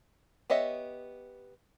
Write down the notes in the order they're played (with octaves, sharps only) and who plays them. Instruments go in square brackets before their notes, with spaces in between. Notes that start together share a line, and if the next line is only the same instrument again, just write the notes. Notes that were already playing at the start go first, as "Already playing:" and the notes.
[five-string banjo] B3 G4 C#5 D#5 E5